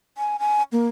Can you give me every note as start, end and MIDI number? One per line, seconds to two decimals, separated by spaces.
0.18 0.37 80
0.39 0.63 80
0.72 0.88 58